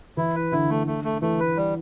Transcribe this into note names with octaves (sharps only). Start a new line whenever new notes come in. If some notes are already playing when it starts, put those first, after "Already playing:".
E3 E4
B4
D3 E4
A3
A3
A3
E3 A3
B4
G3